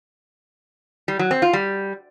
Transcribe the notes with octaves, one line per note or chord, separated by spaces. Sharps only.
G3
F#3
C4
F4
G3